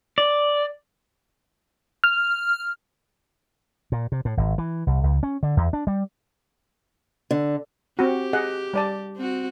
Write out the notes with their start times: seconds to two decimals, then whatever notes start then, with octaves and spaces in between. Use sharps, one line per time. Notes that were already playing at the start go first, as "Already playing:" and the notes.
0.18 D5
2.04 F6
3.92 A#2
4.12 C3
4.25 A2
4.37 G#1
4.58 E3
4.87 C2
5.04 C#2
5.23 C#4
5.43 D3
5.57 E2
5.73 D4
5.87 G3
7.31 D3
7.99 C4 F#4 G4
8.33 G#4 D#5 F#5
8.74 G3 D5 A5
9.17 C4 F#4